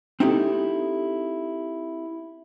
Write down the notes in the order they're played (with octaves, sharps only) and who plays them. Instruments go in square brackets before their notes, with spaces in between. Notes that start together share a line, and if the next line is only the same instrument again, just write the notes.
[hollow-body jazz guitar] C4 D#4 E4 G4 A4